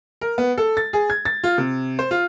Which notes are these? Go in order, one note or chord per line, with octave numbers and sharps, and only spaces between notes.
A#4
B3
A4
A6
G#4
G#6
A6
F4
C3
C5
F4